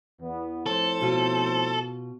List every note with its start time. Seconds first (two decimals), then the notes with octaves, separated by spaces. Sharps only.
0.22 E2 B3
0.66 F2 A2 A4 C5
1.01 B2 F4